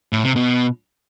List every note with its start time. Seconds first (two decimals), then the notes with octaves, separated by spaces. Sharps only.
0.13 A2
0.24 C3
0.36 B2